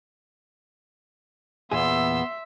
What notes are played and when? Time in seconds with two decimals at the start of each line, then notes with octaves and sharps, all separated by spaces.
1.72 E2 A#2 B3 G#4 E5 C6 E6